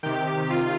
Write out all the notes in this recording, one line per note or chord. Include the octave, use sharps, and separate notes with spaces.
C3 D#3 G4
C3 D#3 F4